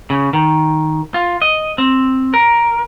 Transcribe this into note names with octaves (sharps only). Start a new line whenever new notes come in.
C#3
D#3
F4
D#5
C4
A#4